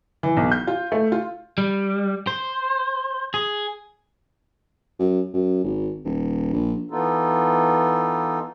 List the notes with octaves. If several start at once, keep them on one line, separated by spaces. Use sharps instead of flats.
E3
B1
G6
F4
A3
F4
G3
C5
G#4
F#2
F#2
G#1
D#1
A#1
E3 B3 D#4 F4 A4